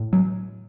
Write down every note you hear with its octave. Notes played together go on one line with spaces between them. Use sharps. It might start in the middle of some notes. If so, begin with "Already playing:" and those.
Already playing: A2
F#3